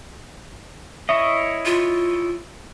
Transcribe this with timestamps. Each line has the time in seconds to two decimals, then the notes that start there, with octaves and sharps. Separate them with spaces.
1.09 E4 C#5 D#5 E5
1.66 F4